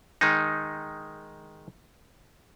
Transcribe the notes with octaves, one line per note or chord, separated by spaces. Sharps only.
D#3 G#3 D#4